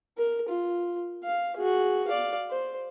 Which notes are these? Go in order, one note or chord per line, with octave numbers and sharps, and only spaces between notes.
A#4
F4
F5
F#4 G#4
D5 F5
C5